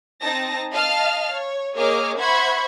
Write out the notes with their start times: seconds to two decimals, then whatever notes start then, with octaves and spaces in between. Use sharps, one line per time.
0.21 C4 D#4 A5 A#6
0.72 D#5 F5 A5 F6
1.34 C#5
1.75 A#3 G#4 C#5 D#5 D6 F6
2.17 C5 E5 F#5 B5 C#6 G#6